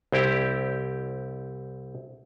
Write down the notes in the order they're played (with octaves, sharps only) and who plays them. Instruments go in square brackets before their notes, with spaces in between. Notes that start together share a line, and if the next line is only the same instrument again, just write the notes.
[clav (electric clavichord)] C2 C4 E4 G4